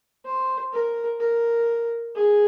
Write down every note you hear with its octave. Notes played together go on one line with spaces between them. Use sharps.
C5
A#4
A#4
G#4